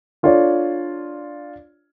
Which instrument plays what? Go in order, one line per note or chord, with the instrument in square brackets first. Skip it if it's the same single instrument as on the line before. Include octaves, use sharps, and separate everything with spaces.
[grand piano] D4 F4 A4 C#5 D5